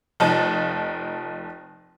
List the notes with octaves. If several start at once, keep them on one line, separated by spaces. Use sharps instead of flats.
F1 F3 D#4 A5